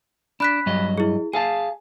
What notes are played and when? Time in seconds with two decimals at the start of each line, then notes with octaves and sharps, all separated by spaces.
0.40 D4 B5 F#6 B6
0.66 G2 F#3 D#5
0.98 E4 G#4
1.33 G#4 F5 G#5 A5